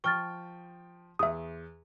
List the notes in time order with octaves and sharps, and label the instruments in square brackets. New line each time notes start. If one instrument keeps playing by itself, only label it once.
[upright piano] F3 G5 G7 [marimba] C#6 F6 A6
[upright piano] E2 [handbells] E5 D#6